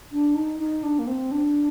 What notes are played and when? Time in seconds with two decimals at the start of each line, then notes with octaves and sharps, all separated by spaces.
0.12 D4
0.35 D#4
0.60 D#4
0.83 D4
0.99 A#3
1.07 C4
1.32 D4